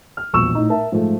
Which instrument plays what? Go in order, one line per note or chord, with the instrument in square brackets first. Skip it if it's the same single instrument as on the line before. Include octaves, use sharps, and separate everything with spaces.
[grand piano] F6
E1 A#1 C#6 E6 E7
A2 D#4
A#4 E5 A5
G#2 F3 G#3 A3